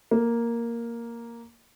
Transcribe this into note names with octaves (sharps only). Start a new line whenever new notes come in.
A#3